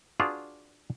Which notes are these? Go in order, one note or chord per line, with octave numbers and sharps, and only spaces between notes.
D4 F4 F#4 G#4 B4 D5